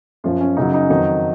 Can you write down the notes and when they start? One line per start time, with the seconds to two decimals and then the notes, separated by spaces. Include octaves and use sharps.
0.24 F#2 F3 F4
0.41 C#4
0.57 F#2 C#3 F#3 D#4
0.74 D#4
0.90 F2 D#3 F#3 D#4